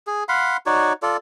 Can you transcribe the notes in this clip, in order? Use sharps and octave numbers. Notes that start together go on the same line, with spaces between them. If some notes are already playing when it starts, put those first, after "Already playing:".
G#4
F5 F#5 B5 C6
D#4 F#4 C#5 D5
F4 A4 D5